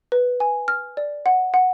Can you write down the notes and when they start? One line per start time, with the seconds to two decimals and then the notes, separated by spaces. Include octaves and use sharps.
0.12 B4
0.40 G#5
0.68 F6
0.97 D5
1.26 F#5
1.54 F#5